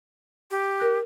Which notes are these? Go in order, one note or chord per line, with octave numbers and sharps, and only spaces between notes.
G4
A#4 F#6